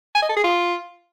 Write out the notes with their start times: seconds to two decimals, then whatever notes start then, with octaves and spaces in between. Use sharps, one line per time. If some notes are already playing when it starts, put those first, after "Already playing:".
0.15 G#5
0.22 D#5
0.29 A4
0.37 G#4
0.44 F4